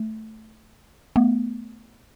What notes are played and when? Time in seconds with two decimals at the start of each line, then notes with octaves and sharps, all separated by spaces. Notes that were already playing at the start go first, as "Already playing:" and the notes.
Already playing: A3
1.16 A3 B3